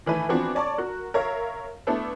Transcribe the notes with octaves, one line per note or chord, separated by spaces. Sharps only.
D#3 E3 A3 B4
E3 F3 B3 C4 D4 F#4
C#5 D5 A5 C#6 D6
F#4 A#4
A#4 C#5 E5 F5
A3 B3 D4 E4 A4